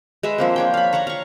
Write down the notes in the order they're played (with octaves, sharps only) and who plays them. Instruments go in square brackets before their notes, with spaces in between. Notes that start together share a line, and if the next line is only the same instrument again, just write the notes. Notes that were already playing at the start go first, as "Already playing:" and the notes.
[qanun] G#3 B4 E5
F3 A#3 C4
D4 C#5 G5
F5 B5
C#5 F5 F#5 A#5
F5 C#6